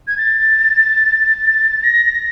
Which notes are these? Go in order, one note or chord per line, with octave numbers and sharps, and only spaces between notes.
G#6
A6
A#6
A#6